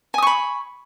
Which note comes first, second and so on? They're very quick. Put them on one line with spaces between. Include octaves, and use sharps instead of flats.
G#5 D#6 C#6 B5